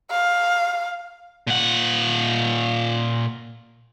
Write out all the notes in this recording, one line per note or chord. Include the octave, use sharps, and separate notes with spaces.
F5
A#2 F#5